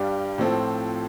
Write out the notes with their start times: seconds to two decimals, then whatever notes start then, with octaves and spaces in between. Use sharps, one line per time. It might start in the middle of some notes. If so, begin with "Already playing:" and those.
Already playing: G2 G3 D4 G4 F5
0.38 A2 F3 C4 A4